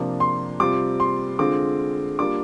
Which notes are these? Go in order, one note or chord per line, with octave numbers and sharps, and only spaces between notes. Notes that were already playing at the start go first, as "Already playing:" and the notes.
Already playing: C3 F3 A#3 D4
C6
C3 G3 C4 F4 D6
C6
D3 G#3 C4 F4 D6
G3 A#3 D4 F4 D6